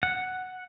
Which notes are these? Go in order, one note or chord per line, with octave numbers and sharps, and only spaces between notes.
F#5